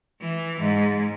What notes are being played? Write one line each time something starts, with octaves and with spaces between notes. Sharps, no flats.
E3
G#2